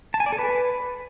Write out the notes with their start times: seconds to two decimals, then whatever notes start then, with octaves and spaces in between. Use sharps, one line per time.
0.14 A5
0.20 G#5
0.26 D5
0.32 A4
0.39 B4